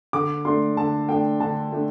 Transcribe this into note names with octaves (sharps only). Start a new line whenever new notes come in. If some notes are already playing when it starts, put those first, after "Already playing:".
D3 D6
A3 D4 C6
D3 A5
A3 D4 G5
D3 A5
A3 D4